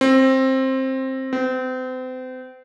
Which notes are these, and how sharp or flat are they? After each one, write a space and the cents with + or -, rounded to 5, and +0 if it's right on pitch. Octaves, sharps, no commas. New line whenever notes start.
C4 +15
C4 -35